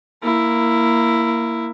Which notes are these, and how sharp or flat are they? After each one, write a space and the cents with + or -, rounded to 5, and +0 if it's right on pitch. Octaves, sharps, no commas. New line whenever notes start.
A#3 -5 E4 +10